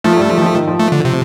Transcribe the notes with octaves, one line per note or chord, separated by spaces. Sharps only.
F3 A3 F4
G2 G3
F3
D#3
F3
D#3
F3
A3
D3
C3